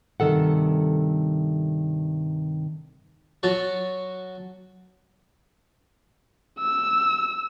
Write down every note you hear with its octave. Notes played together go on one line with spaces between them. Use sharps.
G2 C3 D#3 A4 F#5
F#3 F#4 A5
E6